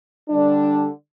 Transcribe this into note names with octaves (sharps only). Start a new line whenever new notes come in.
D3 G3 D4